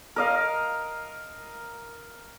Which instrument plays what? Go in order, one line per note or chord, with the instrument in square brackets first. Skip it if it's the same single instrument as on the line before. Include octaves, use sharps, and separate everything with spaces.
[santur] A#4 D#5 F5